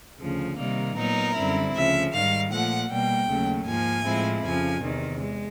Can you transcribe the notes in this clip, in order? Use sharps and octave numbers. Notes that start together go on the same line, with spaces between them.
D2 C#3 F3
C3 D#3 G3 A#3
A#2 F#3 B3 D#4 A#4
F#2 D3 G3 C4 E4
D2 C#3 F3 E5
G#2 D#3 G3 F5
A#2 F3 A3 F#5
B2 G3 A#3 G5
D#2 C#3 F#3 A3
G#2 F3 A#3 G#5
A2 F3 G#3 C4 E4
F2 C#3 F3 G#5
E2 C3 D#3
G#3